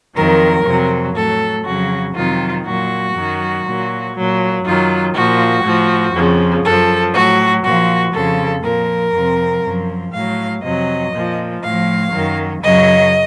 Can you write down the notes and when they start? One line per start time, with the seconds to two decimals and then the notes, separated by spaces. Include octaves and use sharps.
0.15 F2 D#3 F#3 A#4
0.64 F2 C3 F#3
1.15 A2 F#3 A4
1.64 F2 C#3 F#3 F#4
2.14 F2 C3 D#3 F#3 F4
2.65 A#2 F#3 F#4
3.14 F#2 D#3 F#3
3.64 A#2 F#3
4.14 A#2 F#3
4.64 F#2 D#3 F#3 F4
5.14 A#2 F3 F#4
5.64 A2 F3
6.14 F2 C#3 F3
6.63 F#2 F3 A4
7.14 A2 F#3 F#4
7.64 A#2 F3 F#4
8.13 F2 C#3 F3 A4
8.63 A#2 F3 A#4
9.13 F2 C3 F3
9.63 F#2 F3
10.13 A2 F#3 F5
10.63 F2 C3 F#3 D#5
11.13 A#2 F3
11.63 A2 F3 F5
12.13 F#2 D#3 F#3
12.63 F#2 C#3 F#3 D#5